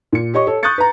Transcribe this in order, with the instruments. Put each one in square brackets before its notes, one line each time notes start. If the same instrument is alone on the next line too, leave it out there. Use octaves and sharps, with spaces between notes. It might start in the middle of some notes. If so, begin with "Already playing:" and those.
[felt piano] A#2 C#7
G4 C#5 D#5 C#6
A4 C#5
C#6 D#6 F#6 G6 A6 C#7
B4 A#5